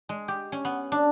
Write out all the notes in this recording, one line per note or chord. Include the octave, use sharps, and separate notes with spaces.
G#3
G4
C#4
B3
D4